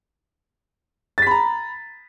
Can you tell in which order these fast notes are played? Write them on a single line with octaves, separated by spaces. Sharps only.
A6 B6 B5 A#5